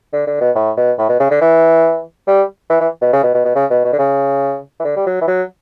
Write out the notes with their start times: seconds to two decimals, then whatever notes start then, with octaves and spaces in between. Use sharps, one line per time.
0.13 D3
0.27 D3
0.41 B2
0.56 A2
0.77 B2
0.98 A2
1.09 B2
1.20 C#3
1.30 D3
1.42 E3
2.28 G3
2.70 E3
2.81 E3
3.02 B2
3.13 C#3
3.23 B2
3.34 B2
3.45 B2
3.55 C#3
3.70 B2
3.84 B2
3.93 D3
3.99 C#3
4.80 E3
4.84 D3
4.97 G3
5.06 F#3
5.21 E3
5.27 F#3